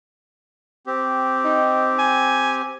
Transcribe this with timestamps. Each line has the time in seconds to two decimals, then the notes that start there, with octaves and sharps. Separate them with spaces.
0.87 C4 G4
1.44 D#4
1.99 G#5